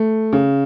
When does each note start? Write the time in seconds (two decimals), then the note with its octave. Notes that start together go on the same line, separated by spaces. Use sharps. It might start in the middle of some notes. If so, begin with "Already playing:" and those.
Already playing: A3
0.33 C#3